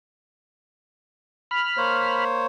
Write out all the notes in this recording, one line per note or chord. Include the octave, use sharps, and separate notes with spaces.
B5 F6
A#3 C5 C#5